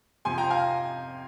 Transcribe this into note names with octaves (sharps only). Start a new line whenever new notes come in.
F2 C3 F3 G#5 C6
G5 A#5
F5 G#5